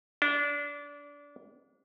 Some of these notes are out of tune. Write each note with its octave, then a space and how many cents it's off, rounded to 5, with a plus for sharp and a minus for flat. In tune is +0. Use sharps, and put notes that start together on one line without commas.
D4 -25 D5 -5